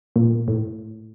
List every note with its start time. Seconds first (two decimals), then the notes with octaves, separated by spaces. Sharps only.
0.16 A#2
0.48 A2